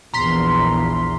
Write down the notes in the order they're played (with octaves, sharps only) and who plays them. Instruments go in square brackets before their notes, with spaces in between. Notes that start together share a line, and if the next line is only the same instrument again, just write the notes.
[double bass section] A#1 E2 [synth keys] A#5 C6 B6